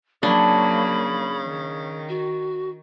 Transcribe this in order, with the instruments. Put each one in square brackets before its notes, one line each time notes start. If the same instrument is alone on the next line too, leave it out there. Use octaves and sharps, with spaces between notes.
[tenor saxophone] C#3 [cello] F#3 A#3 [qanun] D4 [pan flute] B5
[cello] D#3
[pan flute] F#4